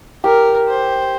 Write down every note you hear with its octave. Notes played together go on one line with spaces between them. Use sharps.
G4 A#4
C5